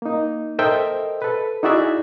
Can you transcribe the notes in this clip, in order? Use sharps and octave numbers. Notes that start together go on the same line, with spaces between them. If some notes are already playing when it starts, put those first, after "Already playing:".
A#3 D#4
A4 A#4 C5 D#5 E5 G5
A4 B4
D#4 E4 F#4 G#4 D5 E5